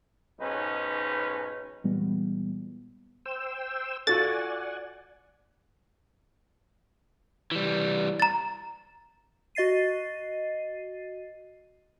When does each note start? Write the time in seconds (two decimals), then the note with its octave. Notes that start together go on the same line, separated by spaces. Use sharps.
0.40 B1 G#2 C#4 D#4 B4
1.84 A#2 E3 G3 G#3 B3
3.26 C5 G5 E6
4.07 F4 F#4 A4 D5 F#5 G#5 A6
7.52 E3 G3
8.20 A#5 A6
9.55 F#4 D#5 A6 C7 D#7